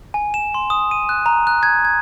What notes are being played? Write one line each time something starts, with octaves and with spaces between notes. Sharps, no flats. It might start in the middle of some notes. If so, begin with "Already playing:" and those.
G#5
E7
C6
D#6
D#7
F#6
A#5
F#6
G#6
G#6